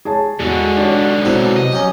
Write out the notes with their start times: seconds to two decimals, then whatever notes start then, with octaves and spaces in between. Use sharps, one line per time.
0.05 G#4 C#5 A5
0.39 E2 G#2 D3 F#4
0.77 D4 G4 C#5
1.25 B2 F#3 C4 E4
1.56 C3 D#5
1.72 F#3 C#4 G4